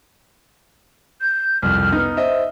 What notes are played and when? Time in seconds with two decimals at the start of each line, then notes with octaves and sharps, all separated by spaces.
1.21 G6
1.62 C2 F2 F6
1.92 B3 D#4
2.17 C5 D#5 E5